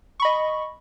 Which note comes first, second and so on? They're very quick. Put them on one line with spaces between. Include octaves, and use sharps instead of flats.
C#6 B5 D#5